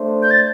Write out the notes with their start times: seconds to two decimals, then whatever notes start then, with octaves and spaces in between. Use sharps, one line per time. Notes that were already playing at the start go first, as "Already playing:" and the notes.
Already playing: A3 D4 C5
0.23 G6
0.31 A6